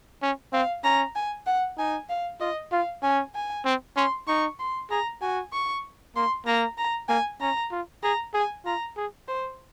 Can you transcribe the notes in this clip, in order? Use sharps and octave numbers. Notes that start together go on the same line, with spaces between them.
C#4
C4 F5
C#4 A#5
G#5
F#5
D#4 G#5
F5
F4 D#5
F4 F5
C#4 G#5
G#5
C4
C#4 C6
D#4 C#6
C6
G#4 A#5
F#4 G#5
C#6
A#3 C6
A#3 A#5
A#5
A#3 G#5
C#4 A#5
F4
G#4 A#5
G#4 G#5
F4 A#5
G#4
C5